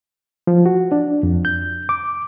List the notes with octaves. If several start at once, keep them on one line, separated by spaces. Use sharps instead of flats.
F3
F#4
D4
F2
G6
D6